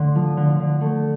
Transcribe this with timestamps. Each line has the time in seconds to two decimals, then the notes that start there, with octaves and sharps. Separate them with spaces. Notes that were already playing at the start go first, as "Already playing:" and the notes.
Already playing: D3 A3 C6 D6
0.15 F3
0.37 D3
0.60 D3
0.81 A3